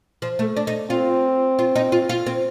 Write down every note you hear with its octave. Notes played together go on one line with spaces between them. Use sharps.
F3
A3
D4
D#4
C4 F4
F4
D#4
F4
F4
C4